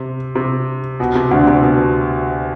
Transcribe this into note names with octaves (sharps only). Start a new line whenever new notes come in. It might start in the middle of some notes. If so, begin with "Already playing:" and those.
Already playing: C3
C3
B2
C3
D2 D3
C3
B2